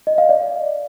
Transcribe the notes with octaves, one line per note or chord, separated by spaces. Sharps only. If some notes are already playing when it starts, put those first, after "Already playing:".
D#5
F5
D5